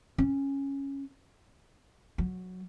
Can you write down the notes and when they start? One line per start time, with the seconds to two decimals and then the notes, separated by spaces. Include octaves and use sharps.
0.18 C#4
2.18 F#3